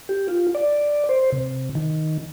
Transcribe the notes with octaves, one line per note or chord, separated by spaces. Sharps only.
G4
F4
D5
C5
C3
D#3